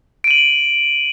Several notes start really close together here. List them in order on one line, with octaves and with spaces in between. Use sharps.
D7 D#7 F#7